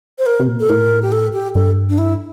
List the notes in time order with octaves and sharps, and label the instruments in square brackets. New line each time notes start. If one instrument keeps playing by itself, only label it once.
[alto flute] C5
A#4
[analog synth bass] C3
A#2
[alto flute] A4
[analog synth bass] A2 [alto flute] A#4
[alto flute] G4
A4
G4
[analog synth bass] G2 [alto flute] A4
[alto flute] D4
E4